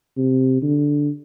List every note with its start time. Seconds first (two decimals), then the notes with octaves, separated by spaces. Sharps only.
0.17 C3
0.62 D3